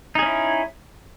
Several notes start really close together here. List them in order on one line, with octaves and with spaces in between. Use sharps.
D#4 G#4 C#4 E4